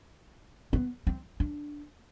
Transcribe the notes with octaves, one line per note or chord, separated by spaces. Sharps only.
B3
C4
D4